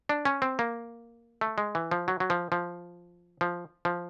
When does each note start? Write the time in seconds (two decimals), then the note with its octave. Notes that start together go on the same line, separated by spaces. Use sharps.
0.09 D4
0.25 C#4
0.42 C4
0.59 A#3
1.41 A3
1.58 G#3
1.75 E3
1.91 F3
2.08 F#3
2.20 F#3
2.30 F3
2.52 F3
3.41 F3
3.85 F3